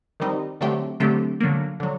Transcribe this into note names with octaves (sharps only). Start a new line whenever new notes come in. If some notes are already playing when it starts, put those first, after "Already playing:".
D#3 G3 C4 D#4
D3 F#3 A3 C4 G4
D3 F#3 A3 C4 G4
D3 F#3 A#3
D3 F#3